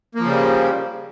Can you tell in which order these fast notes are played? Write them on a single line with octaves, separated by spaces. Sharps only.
A#3 F3 C#3 G3